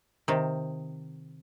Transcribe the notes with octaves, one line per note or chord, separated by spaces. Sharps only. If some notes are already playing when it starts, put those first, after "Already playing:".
C3 D#3